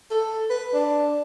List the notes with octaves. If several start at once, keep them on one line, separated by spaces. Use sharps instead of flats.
A4
B4
D4